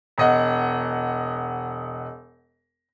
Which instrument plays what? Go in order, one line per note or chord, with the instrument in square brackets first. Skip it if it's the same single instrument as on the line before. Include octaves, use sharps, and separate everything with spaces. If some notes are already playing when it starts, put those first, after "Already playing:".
[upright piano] E1 D#5 F#5